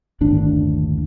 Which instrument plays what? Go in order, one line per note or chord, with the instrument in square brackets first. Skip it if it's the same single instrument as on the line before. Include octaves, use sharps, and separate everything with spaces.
[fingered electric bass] G1 D#2 A2 D4